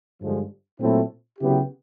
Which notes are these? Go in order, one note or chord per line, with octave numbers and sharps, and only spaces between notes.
G2 D3 F3 G#3
A#2 F#3 A3 C4 E4
C#3 F#3 B3 E4 G4